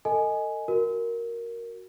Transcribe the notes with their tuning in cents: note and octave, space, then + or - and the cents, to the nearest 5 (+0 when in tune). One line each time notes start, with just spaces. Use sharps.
A4 +40 D#5 +0 G#5 +10
F#4 +0 A#4 +0